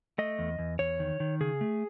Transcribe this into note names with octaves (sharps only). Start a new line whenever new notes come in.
A3 D#5
E2
E2
E2 C#5
D#3
D#3
C#3 G#4
A3